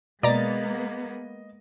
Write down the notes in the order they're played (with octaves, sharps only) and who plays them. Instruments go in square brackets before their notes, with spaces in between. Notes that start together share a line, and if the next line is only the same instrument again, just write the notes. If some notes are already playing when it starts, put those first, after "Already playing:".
[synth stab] B2 A6 [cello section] G#3 A#3 B3 [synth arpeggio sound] D5 A#5 [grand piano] D#5